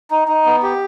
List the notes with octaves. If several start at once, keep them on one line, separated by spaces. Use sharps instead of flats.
D#4
D#4
B3
G4